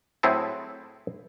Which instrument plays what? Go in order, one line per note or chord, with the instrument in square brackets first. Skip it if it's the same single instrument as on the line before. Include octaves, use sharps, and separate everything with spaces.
[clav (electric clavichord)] A2 F#3 C4 E4 G#4 A4